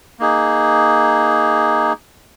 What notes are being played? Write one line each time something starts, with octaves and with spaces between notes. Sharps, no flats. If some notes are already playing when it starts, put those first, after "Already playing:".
A#3 D#4 G#4